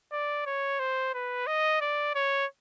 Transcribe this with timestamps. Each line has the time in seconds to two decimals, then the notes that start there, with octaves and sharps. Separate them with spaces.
0.12 D5
0.46 C#5
0.80 C5
1.14 B4
1.47 D#5
1.81 D5
2.15 C#5